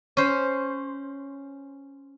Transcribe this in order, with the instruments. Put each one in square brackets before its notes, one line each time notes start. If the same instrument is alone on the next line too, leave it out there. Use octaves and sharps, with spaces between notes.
[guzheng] C#4 C5